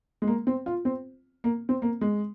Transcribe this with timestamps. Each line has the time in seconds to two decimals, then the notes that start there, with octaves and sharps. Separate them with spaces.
0.22 G#3
0.27 A#3
0.47 C4
0.66 F4
0.85 C4
1.44 A#3
1.69 C4
1.82 A#3
2.01 G#3